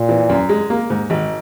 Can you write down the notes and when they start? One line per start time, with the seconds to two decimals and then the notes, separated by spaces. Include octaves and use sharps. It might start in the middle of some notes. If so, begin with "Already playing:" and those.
Already playing: A#2
0.09 E3
0.30 F#2
0.49 G#3
0.70 A#3
0.90 G#2
1.10 G#1